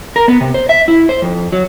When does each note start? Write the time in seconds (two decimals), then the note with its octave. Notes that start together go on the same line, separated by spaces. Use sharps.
0.16 A#4
0.28 B3
0.41 C3
0.54 C5
0.69 E5
0.88 E4
1.09 C5
1.22 F2
1.52 F#3